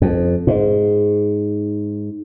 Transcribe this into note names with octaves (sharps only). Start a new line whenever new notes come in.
F2
G#2